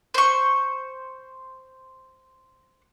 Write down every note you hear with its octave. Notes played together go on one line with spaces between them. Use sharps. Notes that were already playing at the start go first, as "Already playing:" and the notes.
C5 C#6